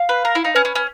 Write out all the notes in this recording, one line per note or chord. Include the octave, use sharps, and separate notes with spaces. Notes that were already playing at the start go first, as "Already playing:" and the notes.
Already playing: F5
B4
A#4
E4
D#4
C#4 B4
C#4
C#4